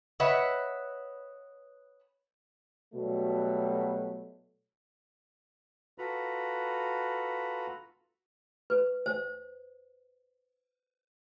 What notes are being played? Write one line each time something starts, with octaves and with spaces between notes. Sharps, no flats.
B4 C#5 D#5 E5 F#5
B2 F#3 G3 A3
F4 F#4 A4 B4 A#5 B5
B4
C5